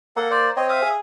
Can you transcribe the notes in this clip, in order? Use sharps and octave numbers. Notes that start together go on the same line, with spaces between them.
A#3 A4 F#5
C5 D5
C4 C#5 D#5
E5 F5 D#6
G#4